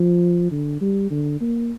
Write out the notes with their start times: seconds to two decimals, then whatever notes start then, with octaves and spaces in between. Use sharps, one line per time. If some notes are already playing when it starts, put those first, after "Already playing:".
Already playing: F3
0.51 D3
0.81 G3
1.11 D3
1.41 A#3